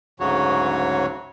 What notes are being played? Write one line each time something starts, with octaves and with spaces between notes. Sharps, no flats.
D2 G#2 C#3 F#3 F#4 C#5